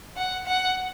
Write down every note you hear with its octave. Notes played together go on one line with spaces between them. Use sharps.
F#5
F#5